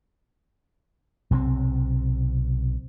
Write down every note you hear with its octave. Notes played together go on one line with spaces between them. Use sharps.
B1 C3 G3 C4